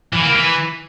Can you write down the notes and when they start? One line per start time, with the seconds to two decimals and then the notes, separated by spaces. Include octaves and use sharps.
0.13 E3
0.22 A#3
0.32 E3